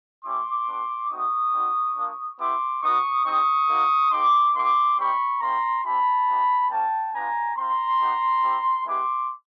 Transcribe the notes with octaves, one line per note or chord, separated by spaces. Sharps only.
A3 C#4 E4 G4 C6 D6
B3 D4 G4
A3 C4 D#4 F#4 C#6 D#6
C4 D#4 F#4
A#3 D4 F4
B3 E4 G4 C6 D6
B3 D#4 F#4 C#6 D#6
C4 D#4 G4 C#6 D#6
A#3 D#4 F#4
A#3 D#4 G4 C6 D6
A#3 D#4 G4 C6 D6
G3 C4 D#4 G4 B5 C#6
A#3 C#4 E4 G4 A#5 C6
C4 E4 G4 A5 B5
B3 D#4 G4
A#3 C#4 F4 G5 A5
B3 D4 F4 G#5 A#5
C4 F4 A#5 C6
B3 D#4 G4
C4 E4 G4
G#3 B3 E4 G4 C6 D6